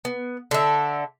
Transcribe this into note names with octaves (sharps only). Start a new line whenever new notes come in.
B3
D3 E5